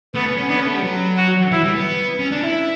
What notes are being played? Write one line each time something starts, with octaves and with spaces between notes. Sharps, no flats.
A3 B3
C#4
C#4
B3 D4
C#4
A3
G3
F#3
F#4
E3 E4
G3
B3
C#4
D4
E4